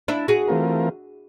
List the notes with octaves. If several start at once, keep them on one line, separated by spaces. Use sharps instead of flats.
D4 E4
F#4 G#4
E3 A3 C4 F4 A#4